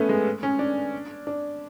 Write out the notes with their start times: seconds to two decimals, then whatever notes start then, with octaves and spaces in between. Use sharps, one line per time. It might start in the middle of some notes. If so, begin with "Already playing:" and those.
Already playing: A3 B3 C#4
0.09 G#3
0.43 C#4
0.59 D4
1.27 D4